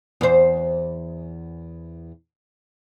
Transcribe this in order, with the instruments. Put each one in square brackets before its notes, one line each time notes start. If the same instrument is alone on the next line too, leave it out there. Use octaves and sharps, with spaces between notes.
[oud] E2 C5